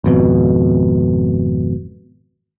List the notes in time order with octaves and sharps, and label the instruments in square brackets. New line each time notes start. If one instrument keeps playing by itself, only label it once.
[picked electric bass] G#1 F2 B2